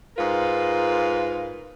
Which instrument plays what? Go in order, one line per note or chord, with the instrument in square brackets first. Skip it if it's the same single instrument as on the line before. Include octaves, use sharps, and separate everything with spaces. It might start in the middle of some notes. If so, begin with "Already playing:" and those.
[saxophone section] G#2 F4 A#4 B4